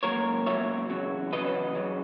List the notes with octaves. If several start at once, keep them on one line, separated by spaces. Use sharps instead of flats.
C#2 B2 F#3 A#3 A#4 C#5
C#2 B2 F#3 A#3 C#5 E5
E2 C#3 F#3
E2 C#3 F#3 B4 D#5
F#2 C#3 F#3